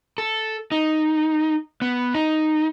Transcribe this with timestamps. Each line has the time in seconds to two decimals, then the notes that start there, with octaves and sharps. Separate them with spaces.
0.18 A4
0.72 D#4
1.82 B3
2.14 D#4